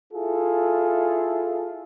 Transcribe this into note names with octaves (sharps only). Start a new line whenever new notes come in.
E4 F4 G#4 A4